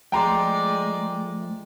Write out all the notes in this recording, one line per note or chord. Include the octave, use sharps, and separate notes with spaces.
F3 G#3 A3 D5 G5 A#5 C6